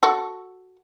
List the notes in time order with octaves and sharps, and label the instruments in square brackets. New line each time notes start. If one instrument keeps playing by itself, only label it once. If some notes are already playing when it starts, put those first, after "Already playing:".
[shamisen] F#4 A4